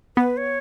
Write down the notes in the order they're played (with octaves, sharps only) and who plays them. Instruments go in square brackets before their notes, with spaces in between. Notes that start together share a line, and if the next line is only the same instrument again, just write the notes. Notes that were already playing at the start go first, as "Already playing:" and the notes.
[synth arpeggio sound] B3 [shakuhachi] B4
[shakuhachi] C#5